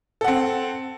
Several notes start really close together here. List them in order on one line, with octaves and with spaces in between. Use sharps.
A4 F#5 C4